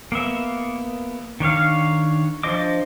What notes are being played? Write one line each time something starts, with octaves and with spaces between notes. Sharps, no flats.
A#3 B3 E5
D#3 D4 C#5 F5
F3 D4 C5 D#5 D6